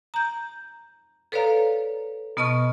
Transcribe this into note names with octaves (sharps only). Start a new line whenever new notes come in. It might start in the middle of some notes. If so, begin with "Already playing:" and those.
A#5 G6
A4 B4 C#5 D5 F5 A#5
B2 B3 D#5 A5 C#6 F6